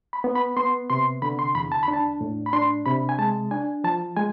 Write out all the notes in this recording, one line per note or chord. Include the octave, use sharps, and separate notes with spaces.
B5
B3
B5
B3 C6
C3 C6
D3 B5
C6
E2 B5
A5
B5
D4
A5
A2
B5
D4 C6
C3 B5
G#5
G#3 A5
D4 G#5
F3 A5
G#3 G#5